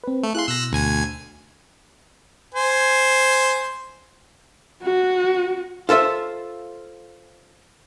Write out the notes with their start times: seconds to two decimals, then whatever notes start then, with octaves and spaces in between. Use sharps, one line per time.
0.04 C4 B4
0.23 A3
0.35 E4 G#4 F5 C6 F#6
0.48 B2 E6 F#6 A#6
0.72 D2 G#5 G#6
2.54 C5 G#5
4.82 F#4
5.89 F4 A4 C5 E5